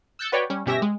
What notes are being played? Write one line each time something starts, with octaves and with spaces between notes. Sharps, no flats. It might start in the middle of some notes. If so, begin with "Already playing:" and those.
E6 F#6 G6 A6 C#7
F#4 B4 C#5 D5 G5
G3 C#4
G1 B2 C#4 G4 E5 A#6
G#3